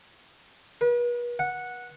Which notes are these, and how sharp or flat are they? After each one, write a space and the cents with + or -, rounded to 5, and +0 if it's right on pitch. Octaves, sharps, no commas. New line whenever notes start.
B4 -40
F#5 -10